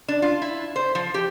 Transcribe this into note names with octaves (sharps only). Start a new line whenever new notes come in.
D4
F4
E4
C5
F3
G4